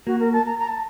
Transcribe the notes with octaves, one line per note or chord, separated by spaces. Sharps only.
A#3 F#4
A#4
A5
A#5
A#5
A5